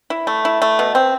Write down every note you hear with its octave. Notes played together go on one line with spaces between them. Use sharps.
E4
A3
E4
A3
B2
C4